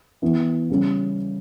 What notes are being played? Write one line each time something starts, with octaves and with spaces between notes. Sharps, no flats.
E3 B3 E4
C#3 G3 C#4